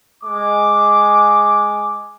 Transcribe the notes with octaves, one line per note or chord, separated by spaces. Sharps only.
G#3 D6